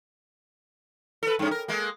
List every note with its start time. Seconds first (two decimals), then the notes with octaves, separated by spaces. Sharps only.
1.23 A4 B4
1.39 G2 C#4
1.51 A#4
1.68 G#3 A#3